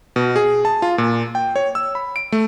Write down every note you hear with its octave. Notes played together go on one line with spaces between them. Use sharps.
B2
G#4
A5
F4
A#2
G5
C#5
E6
B5
D7
A3